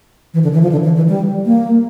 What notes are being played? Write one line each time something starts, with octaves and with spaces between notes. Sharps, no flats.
E3
D3
E3
F3
D3
E3
E3
G3
A#3